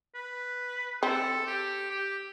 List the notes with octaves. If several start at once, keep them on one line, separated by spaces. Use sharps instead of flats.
B4
C4 A4
G4
G4